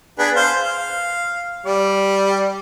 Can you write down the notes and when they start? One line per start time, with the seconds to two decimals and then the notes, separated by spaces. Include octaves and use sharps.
0.19 B3 D4 G#4
0.36 C5 F5
0.62 F5
1.66 G3 D5